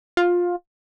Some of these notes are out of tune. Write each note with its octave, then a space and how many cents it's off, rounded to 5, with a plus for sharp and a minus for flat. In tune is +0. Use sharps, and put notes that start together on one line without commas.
F4 +15